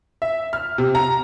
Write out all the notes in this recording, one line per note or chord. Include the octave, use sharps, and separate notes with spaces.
E5
F6
C3
A#5